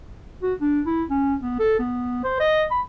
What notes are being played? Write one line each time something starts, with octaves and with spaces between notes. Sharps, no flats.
F#4
D4
E4
C#4
B3
A4
B3
C5
D#5
B5